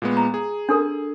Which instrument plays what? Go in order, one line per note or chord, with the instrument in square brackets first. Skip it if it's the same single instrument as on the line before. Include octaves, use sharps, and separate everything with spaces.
[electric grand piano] A#2 G#3 B3
[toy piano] A#5
[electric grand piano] G#4
[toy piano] D4 A4 A#4